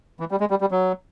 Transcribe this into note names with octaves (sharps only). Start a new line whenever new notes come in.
E3
G3
G#3
G3
G3
F#3